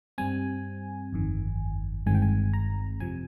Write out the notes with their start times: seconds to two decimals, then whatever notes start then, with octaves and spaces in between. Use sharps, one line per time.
0.18 G2 G3 C4 G#5
1.13 G1 F2 D#3
2.06 G1 G2 D#3 G#3 C4 G#5
2.15 G5
2.22 G#5
2.53 A#5
3.00 F2 C3 F3 G#5